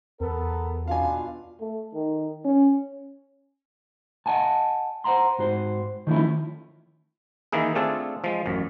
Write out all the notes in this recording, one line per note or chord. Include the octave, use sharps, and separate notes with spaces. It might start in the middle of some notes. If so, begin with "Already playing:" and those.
E2 B3 A4 A#4
B2 D4 F4 F5 G#5
A3
D#3
C#4
D#5 F#5 G#5 A5
C5 D5 F#5 A#5 C6
G#2 F#4 C5
D#3 F3 A3 C#4 E4
D#3 E3 A#3 E4 G#4
A3 C4 D4 F4 G#4 A4
F3 G#3
A1 F#2